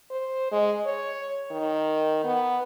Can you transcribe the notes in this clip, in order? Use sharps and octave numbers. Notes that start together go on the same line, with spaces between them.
C5
G#3
C#5
D#3
B3